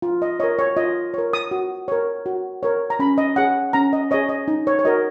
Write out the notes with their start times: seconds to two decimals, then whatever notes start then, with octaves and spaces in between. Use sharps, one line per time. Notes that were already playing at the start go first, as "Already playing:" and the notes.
0.02 F4
0.22 D#5
0.40 A#4 C#5 D#5
0.59 C#5
0.77 F4 D#5
1.14 A#4 C#5
1.33 D#6
1.51 F#4
1.88 A#4 C#5
2.26 F#4
2.63 A#4 C#5
2.90 A#5
2.99 C#4 B5
3.18 D#5
3.36 G#4 C#5 F#5
3.73 C#4 A#5
3.93 D#5
4.11 G#4 C#5 D#5
4.29 D#5
4.48 D#4
4.67 C#5
4.79 C#5
4.85 F#4 A#4 D#5